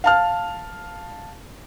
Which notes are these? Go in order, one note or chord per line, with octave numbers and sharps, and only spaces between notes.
F5 A5 F6